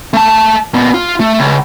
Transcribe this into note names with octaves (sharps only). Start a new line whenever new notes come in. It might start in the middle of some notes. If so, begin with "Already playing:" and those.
A3 A5
A#2 B3
F4
A3
C#2